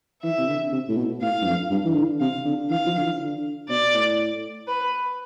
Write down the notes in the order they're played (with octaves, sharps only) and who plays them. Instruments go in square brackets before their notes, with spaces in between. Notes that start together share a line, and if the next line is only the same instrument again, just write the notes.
[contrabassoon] E3 [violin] E5
[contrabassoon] C3
D3
C3
A2
B2
[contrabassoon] A2 [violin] F5
[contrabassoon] G2
F2
G2
E3
D3
[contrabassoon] C3 [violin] F5
[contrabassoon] D3
[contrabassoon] E3 [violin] F5
[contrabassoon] F3
D3
E3
D3
[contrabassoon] B2 [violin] D5
[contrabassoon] A2
[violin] B4